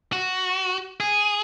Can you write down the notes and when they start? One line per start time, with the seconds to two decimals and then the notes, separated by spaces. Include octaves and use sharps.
0.13 F#4
1.00 G#4